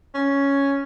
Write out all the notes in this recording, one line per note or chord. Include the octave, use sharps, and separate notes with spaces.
C#4